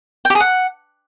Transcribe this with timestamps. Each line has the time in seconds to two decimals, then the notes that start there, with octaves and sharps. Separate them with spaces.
0.25 G5
0.30 G4
0.35 G#4
0.40 F#5